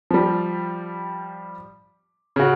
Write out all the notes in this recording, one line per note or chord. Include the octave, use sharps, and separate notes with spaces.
F3 G3
C#3 F#4